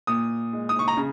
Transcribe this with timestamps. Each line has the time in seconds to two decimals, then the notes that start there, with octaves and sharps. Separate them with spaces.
0.07 A#2 D#6
0.53 G#3
0.69 D#6
0.79 C#6
0.88 A#5
0.97 C#3